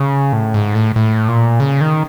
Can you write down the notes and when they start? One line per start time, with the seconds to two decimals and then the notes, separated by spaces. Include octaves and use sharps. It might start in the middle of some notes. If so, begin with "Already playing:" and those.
Already playing: C#3
0.33 A2
0.54 G#2
0.75 A2
0.96 A2
1.28 A#2
1.60 C#3
1.81 D#3